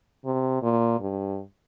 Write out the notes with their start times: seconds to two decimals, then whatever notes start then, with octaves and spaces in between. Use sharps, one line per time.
0.25 C3
0.63 A#2
1.00 G2